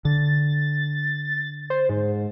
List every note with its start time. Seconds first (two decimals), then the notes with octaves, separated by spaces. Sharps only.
0.05 D3 A6
1.70 C5
1.89 G#2